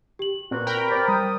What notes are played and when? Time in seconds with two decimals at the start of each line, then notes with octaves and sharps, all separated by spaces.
0.19 G4 F#7
0.51 A#2 C4 F#4 B4
0.67 A#4 G5 B5
0.91 C5 D5
1.08 G3 D#6